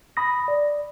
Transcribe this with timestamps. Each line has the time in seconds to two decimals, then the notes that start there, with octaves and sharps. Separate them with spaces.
0.17 B5 D#6 A#6
0.48 D5